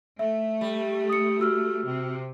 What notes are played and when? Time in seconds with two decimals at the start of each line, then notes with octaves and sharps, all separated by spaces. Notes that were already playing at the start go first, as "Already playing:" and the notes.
0.19 A3 E5
0.61 G3
1.09 D#6 C#7
1.40 F#4 E6 F6
1.84 C3